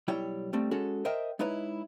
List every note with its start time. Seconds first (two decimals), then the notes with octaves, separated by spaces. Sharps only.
0.08 B1 G3 E4 C#5 G5
0.53 G3 A3 C4
0.71 G#3 C#4 F#4 G#4 A4
1.05 A#4 C5 D#5 E5 G5
1.39 G#3 D#4 E4 B4 C#5